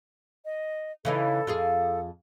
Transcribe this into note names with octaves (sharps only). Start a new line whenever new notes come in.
D#5
C#3 E3 D#4 A4
F2 F4 G#4